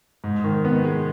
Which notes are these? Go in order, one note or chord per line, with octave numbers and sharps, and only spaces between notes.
G#2
D#3
B3
G#3